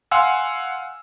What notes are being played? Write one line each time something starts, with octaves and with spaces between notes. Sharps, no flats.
F5 F#5 G#5 C6 E6